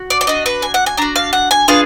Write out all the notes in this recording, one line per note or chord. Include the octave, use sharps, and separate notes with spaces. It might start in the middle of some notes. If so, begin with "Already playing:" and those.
Already playing: F#4
D5
D5
D4 F#4 D#5
B4
G#5
F#5
G#5
D4 F#4 A#5
F5
F#5
G#5
B3 D4 F4 G#4 F5